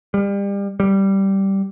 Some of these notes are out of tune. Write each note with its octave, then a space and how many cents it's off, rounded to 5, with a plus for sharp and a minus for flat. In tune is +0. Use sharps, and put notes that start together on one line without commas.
G3 +30
G3 -10